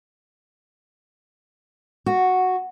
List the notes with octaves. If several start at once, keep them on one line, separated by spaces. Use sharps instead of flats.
F#4